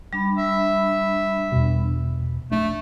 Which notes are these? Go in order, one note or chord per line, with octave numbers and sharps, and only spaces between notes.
G3 D4 B5
E5
E2 B2
A#1 A3 D4